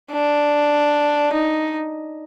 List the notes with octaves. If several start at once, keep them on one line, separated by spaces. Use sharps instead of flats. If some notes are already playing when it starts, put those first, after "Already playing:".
D4
D#4